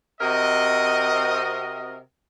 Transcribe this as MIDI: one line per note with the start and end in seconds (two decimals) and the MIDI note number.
0.21 1.97 48
0.21 1.97 60
0.21 1.97 66
0.21 1.97 70
0.21 1.97 75